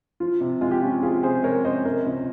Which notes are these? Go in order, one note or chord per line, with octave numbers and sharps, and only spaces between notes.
F3 F4
C3
G#3 F4
G4
C#4 F4
F3 F4 G#4
C3 G#4 C5
G#3 A#4 C#5
C#4 C5 D#5
C3 A#4 C#5
C#2